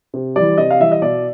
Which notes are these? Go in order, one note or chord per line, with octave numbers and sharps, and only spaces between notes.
C3
E3 G3 D5
C3 D#5
F5
E3 G3 E5
D#5
B2 D5